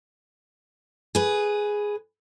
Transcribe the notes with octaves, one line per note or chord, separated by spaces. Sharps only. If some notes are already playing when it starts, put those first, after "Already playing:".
G#4 B4